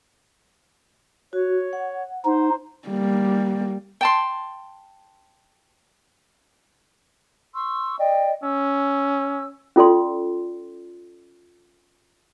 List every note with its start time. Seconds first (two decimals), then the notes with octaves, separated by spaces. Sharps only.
1.33 F#4 C#5
1.73 F#5
2.24 D#4 C5
2.88 G3 A#3
4.01 G5 A5 C6
7.54 C6 C#6 E6
7.99 D5 D#5 G5
8.43 C#4 E6
9.76 C#4 F4 A4 D5 C6